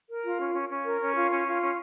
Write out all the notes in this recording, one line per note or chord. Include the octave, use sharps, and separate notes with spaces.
A#4
F4
C#4
C#4
C#4
A#4
C#4
F4
C#4
F4
C#4